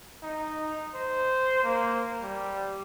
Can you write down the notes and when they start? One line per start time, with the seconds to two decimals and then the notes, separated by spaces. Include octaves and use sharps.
0.23 D#4
0.95 C5
1.64 A#3
2.22 G3